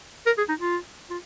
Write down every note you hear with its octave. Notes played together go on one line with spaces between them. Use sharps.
A#4
G#4
D#4
F4
F4